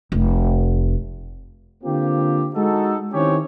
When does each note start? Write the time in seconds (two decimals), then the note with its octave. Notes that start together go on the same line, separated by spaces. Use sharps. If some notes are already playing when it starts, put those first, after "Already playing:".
0.12 F1
1.84 D3 A#3 C4 F4 G4
2.54 G#3 D#4 F#4 G#4 A4
3.13 D#3 C4 C#4 E4 G4 C#5